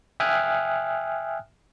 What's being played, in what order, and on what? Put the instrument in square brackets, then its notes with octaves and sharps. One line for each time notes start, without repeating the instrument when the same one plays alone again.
[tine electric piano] E5 G5 G#5 D#6 F6 F#6